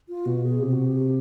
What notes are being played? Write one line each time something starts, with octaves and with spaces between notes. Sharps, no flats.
F4
B2 F#4
G#4
C3 G4
F#4
G4